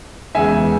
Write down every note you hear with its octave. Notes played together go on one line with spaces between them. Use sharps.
E2 C#3 G#3 E5 G#5